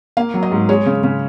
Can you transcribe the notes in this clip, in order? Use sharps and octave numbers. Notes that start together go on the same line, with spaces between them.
A#3 F5
F#3
D#5
G#2
G#3 C#5
C#3
C#3